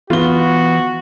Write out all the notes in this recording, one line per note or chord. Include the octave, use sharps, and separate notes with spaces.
E3 B3 F4 F#4 G7